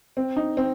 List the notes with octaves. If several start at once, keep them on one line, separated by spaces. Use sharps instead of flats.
C4
D#4
C4